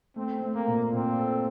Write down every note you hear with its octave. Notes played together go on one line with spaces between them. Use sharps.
A3 C4
A3
A#3
A#2
A#2 C4
A4